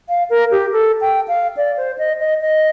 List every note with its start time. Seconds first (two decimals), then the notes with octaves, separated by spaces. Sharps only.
0.09 F5
0.30 A#4
0.51 G4
0.72 A4
1.01 G5
1.28 F5
1.57 D5
1.77 C5
1.98 D#5
2.20 D#5
2.41 D#5